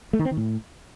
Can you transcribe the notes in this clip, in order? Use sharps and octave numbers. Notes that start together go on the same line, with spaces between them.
A3
D#3
C4
D#3
A2